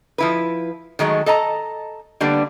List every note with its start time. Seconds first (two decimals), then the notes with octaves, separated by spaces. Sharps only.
0.18 F3 E4 B4
0.99 D#3 F#3 G#3 A3
1.26 A4 D#5 A5 A#5
2.20 D3 G3 A#3 B3 D4